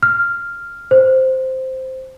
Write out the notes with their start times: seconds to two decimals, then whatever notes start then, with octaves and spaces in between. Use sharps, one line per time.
0.03 F6
0.91 C5